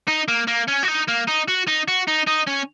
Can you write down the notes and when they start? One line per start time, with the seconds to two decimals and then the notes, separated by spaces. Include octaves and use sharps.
0.08 D#4
0.28 A#3
0.47 A#3
0.68 C#4
0.83 F#4
0.88 D#4
1.08 A#3
1.27 D#4
1.48 F#4
1.68 D#4
1.88 F#4
2.08 D#4
2.27 D#4
2.47 C#4